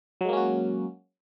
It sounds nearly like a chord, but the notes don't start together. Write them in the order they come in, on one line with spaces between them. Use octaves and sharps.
F#3 G#3 A#3 C#4 F#4